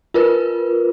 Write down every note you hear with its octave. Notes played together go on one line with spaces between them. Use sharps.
F4 A#4 B4